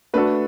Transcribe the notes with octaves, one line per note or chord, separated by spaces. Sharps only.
A3 D4 F#4 A4 B4